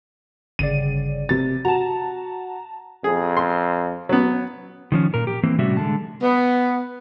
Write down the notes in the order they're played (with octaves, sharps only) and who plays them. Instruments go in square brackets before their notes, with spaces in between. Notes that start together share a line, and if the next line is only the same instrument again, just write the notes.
[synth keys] G1 C#3 D5 [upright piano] D#7
[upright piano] C3 A6
[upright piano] F#4 [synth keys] A5 A#5
[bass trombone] F2 [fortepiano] G#4
[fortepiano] C6
F#3 B3
[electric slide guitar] D#3 F3 C#4
A#2 A#4
G4
E3 A#3 C4
A2 C3 G3 C#4 F#4 E5
D3 G#3 A5
[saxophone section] B3